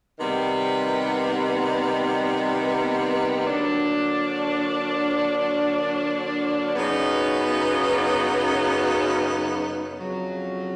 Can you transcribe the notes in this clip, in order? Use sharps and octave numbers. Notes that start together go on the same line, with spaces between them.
C3 D#3 G3 B3
D3 F#3 A#3 D4
F#2 C#3 F#3 B3 D#4
F2 C#3 F#3